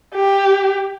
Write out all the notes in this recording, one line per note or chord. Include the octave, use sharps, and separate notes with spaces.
G4